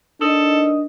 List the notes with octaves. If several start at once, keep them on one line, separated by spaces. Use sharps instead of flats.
D4 D#4 A4 A#4 D#5